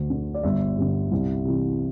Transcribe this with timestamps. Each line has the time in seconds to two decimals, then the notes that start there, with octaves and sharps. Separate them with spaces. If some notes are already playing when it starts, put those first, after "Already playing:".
Already playing: D2
0.10 D3
0.34 D5
0.43 G1 E5
0.77 G2 D3
1.11 C2
1.45 C3 E3